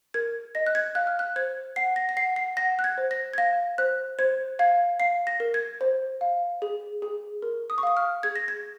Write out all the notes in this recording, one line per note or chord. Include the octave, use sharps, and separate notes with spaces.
A#4 G#6
D#5 A#6
F#6
G#6
F5 F#6
F6
F#6
C5 G#6
F#5 C7
A#6
A#6
F#5 C7
C7
F#5 A#6
F#6
G#6
C5
A#6
G#6
F5 A#6
C5 F#6
C5 G#6
F5 G#6
F5 C7
A#6
A#4
G#6
C5
F5
G#4
G#4
A#4
D#6
C#6
F5 D#6
F6
G#4 G#6
A#6
G#6